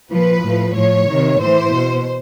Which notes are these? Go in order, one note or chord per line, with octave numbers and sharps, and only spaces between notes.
A#2 F3 B4
A2 F3
A2 F3 C#5
C3 D#3
A2 E3 C5
B2